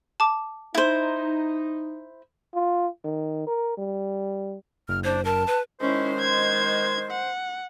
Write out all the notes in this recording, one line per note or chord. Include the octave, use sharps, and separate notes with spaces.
A5 D6
D#4 E4 C5
F4
D#3
A#4
G3
F#1 F6
D4 C5
A#4 A5
B4
D#3 G#3 C#4 E4 C5
G#6
F#5